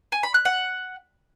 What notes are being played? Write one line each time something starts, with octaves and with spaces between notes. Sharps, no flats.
G#5
B5
F#6
F#5